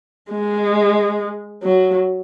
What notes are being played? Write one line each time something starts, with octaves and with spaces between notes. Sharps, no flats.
G#3
F#3